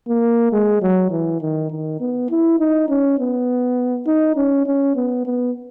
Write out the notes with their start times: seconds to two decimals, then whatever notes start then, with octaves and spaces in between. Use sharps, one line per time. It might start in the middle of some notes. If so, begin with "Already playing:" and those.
0.08 A#3
0.53 G#3
0.82 F#3
1.11 E3
1.41 D#3
1.71 D#3
2.00 B3
2.30 E4
2.60 D#4
2.89 C#4
3.19 B3
4.07 D#4
4.36 C#4
4.66 C#4
4.96 B3
5.26 B3